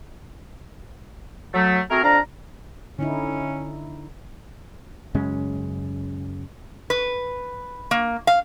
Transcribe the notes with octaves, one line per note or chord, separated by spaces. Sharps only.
F#3 A3
A3 C4 F#4 G#4 A#4
F2 D4 D5 F5 A#5
D3 C#4 D#4 E4
F#2 C#3 G#3 C#4
B4
A#3
F5